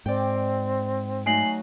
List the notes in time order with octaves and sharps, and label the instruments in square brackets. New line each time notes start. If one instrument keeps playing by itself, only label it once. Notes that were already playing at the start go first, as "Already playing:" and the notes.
[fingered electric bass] G#2 [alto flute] C4 [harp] D5 G5
[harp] F#3 A3 D#4 [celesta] G#5 C7 F#7